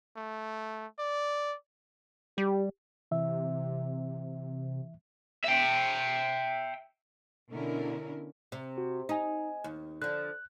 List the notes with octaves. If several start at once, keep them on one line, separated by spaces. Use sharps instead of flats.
A3
D5
G3 G4
C3 E3 E5
E5 G5
B2 D3 C#4 E4 A#4
C3
F#4
D#4 D#5 G#5
D#2
D3 F3 F#6